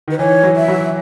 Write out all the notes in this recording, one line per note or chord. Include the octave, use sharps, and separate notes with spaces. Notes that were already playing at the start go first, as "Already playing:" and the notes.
D#3 B4
E3 C#5
F#3
E5
F#3